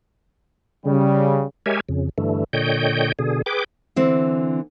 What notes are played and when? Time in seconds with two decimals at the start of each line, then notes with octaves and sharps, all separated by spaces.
0.85 C#3 G3
1.66 G#3 G4 A#4 C#5 E5 G#5
1.89 F2 C#3
2.18 G2 D3 E3 A3
2.53 A#2 D3 C#5 D#5 G5 G6
3.19 B2 D3 G#4
3.46 G#4 B4 G5 D6
3.96 D3 E3 C4